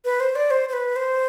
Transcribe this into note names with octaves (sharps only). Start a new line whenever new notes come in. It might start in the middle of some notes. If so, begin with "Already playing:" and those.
B4
C5
D5
C5
C5
B4
C5